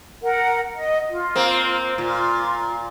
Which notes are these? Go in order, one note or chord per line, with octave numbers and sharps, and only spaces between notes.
A#4 F#5
D#5
F4
A#3 C4
A#2 F4